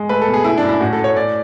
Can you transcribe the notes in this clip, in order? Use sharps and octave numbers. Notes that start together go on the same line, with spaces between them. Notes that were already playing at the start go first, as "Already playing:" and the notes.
Already playing: G#3
A3 B4
A4
B2
G#4
A3 E4
F#2 D4
E4
A2 F#4
A4
A3
C#5
A2 D5